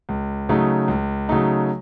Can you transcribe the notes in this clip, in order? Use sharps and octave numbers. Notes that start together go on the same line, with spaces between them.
C#2
C#3 F#3 A3 D#4
C#2
C#3 F#3 A3 D#4